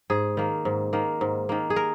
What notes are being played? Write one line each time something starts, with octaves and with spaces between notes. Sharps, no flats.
G#2 G#4
D#3 A#3
G#2
D#3 A#3
G#2
D#3 A#3
G#4
A#4